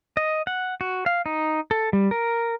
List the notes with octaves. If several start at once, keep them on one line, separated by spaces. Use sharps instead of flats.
D#5
F#5
F#4
F5
D#4
A4
G3
A#4